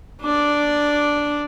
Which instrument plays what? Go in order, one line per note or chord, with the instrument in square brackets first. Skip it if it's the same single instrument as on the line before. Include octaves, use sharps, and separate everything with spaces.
[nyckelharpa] D4 D5